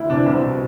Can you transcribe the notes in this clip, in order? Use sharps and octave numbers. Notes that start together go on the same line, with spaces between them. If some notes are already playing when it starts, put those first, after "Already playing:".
Already playing: D2 E4
C3 E3 D4
C2 C4
B2